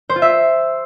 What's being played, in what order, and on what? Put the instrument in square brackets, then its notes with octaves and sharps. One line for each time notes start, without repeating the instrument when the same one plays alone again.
[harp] C5
F4
E5